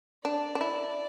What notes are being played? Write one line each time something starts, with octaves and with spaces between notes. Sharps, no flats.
D4 D5
D4
E4